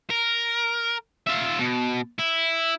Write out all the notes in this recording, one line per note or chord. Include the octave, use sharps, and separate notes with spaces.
A#4
F4 E5
B2
E4